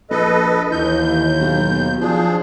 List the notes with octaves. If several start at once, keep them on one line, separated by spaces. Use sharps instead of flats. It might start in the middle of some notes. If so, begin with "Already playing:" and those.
A#1 A4 B4 D#5
D#2 E3 G6
B1
F3 D4 G#4